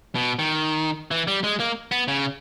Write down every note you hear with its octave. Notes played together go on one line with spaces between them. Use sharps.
B2
D#3
E3
G3
G#3
A#3
B3
C#3